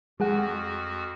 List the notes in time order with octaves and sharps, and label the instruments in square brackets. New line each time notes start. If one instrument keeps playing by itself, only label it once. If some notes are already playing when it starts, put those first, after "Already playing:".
[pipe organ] F2 F#4 [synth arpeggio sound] G#3 G#4 F#5